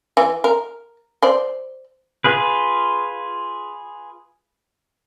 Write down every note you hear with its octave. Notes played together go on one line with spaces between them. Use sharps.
E3
A#4
C5 D5
F4 G#4 B4